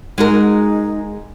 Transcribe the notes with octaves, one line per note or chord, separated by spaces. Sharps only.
G#3 D#4 F#4 A#4